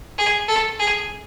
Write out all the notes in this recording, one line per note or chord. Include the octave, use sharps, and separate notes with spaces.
G#4
A4
G#4